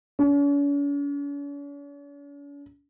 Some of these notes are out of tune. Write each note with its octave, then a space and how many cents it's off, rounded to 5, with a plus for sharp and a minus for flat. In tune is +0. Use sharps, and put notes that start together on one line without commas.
C#4 +45